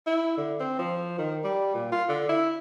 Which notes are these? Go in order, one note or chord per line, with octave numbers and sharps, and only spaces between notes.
E4
D3
C4
F3
D#3
G3
A#2
F4
D3
E4